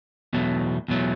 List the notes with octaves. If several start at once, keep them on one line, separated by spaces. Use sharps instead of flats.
E2 B2 F#3 A3
E2 B2 F#3 A3